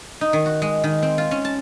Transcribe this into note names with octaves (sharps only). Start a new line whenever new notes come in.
D#4
D#3
F#4
G#3
D#3
C4
F4
C#4
A5